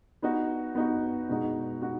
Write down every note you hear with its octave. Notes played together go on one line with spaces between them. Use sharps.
B3 D#4 F#4
B3 D#4 F#4
B2 G#3 D#4 F#4
G#3 D#4 F#4